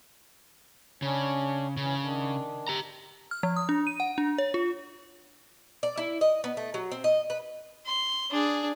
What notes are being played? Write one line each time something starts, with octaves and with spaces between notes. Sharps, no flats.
C#3 C#4 D4 C#5
C#3 E3 C#4
D#3 D4
G4 A#5
F6
F3
D#6
D4
D#7
F#5
D4
C#5
F4
D5
E4
D#5
B3
A3
F#3
C4
D#5
B4
C6
D4 G#4